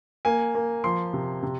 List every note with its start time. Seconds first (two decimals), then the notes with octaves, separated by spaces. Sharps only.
0.25 A#3 G#5
0.55 A#3
0.84 F3 C6
1.13 C3
1.43 C3